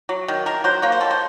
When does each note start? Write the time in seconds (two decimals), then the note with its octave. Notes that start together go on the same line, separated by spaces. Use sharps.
0.09 F#3
0.28 D#3
0.46 D#3 A#4
0.64 F#3 C5
0.82 A#3 C#5
0.92 C5
1.01 D#3 A4
1.11 C5